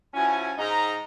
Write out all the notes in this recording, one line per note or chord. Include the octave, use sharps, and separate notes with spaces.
F3 C#4 E4 F#4 G#5
G#2 D#4 A#5